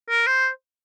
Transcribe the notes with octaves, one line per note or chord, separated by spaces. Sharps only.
A#4
C5